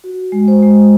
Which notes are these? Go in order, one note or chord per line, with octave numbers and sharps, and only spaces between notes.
F#4
G#3
C5
G#3